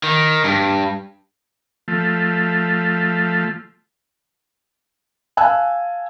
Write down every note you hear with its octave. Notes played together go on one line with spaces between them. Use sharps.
D#3
G2
F3 A3
F5 G#5 A5 E6 F#6